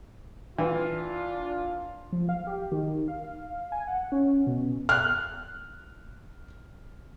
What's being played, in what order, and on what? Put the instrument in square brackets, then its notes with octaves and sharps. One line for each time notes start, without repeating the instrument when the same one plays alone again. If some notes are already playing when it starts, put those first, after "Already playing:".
[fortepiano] E3 [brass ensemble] D4 F4
[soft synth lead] F3
F5
G4
D#3
F5
G#5
F#5
C#4
B2
[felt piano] F6 F#6